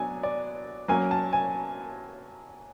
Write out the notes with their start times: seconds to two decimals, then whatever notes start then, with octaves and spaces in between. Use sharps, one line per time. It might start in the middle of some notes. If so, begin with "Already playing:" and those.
Already playing: F#3 B3 D4 G#5
0.23 D5
0.88 F#3 A#3 C#4 G#5
1.11 A5
1.33 G#5